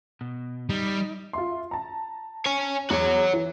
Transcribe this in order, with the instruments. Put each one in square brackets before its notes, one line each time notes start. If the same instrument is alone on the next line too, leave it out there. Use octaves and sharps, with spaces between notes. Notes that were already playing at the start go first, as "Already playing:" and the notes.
[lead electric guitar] B2
[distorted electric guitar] G3 [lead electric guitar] D#4
[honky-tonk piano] F4 E5 C6
A5 A#5
[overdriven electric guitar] C#5 G#5
[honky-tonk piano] E2 [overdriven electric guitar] F#4 C#5
[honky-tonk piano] E3